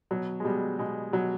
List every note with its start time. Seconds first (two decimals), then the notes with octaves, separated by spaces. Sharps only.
0.11 B2 F#3
0.40 G#3
0.44 B2 G3
0.79 B2 G#3
1.13 B2 F#3